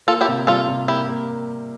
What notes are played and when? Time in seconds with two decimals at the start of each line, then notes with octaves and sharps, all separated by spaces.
0.07 A#3 F4 A4
0.21 E4 G4
0.28 C3
0.47 G3 F4 A4
0.68 C3
0.88 A#3 E4 G4
1.08 A#3